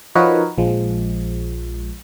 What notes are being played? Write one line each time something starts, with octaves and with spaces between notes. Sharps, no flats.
F3 D#4 F#4 A#4 B4 C#5
A#1 F3 G#3